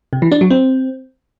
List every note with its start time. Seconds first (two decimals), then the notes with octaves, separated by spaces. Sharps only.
0.13 C3
0.22 E3
0.32 D4
0.41 F#3
0.50 C4